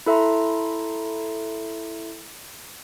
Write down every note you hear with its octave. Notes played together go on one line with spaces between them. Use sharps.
E4 A4 E5 A#5 C6